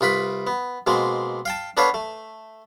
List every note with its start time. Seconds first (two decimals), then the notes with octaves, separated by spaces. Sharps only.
0.01 C2 F4 B4 B5
0.47 B3
0.87 B2 G#3 A#3 C4
1.45 F5 G5 A5
1.77 B3 D4 A4 B4 C#5 F5
1.94 A3